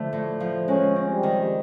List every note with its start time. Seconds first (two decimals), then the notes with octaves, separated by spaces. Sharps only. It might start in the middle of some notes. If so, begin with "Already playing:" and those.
Already playing: D3 F3 A3
0.13 A2
0.40 F3
0.68 G#3 C#4
0.96 C4
1.10 G3
1.23 D#3